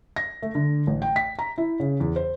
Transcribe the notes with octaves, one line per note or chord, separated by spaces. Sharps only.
A#6
A3
D3
A1
G5
B6
A#5
E4
C#3
E2
C5